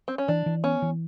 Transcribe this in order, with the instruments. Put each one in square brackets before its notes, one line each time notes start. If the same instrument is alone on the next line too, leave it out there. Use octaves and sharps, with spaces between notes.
[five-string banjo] C4
C#4
[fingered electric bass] E3 [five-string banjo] D4
[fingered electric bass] E3
[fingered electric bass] B3 [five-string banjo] C#4
[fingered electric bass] E3